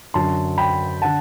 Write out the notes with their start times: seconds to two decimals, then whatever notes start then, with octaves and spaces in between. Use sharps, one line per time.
0.14 F#2 D3 F#3 A5 C6
0.58 G5 B5
1.02 D3 F#5 A5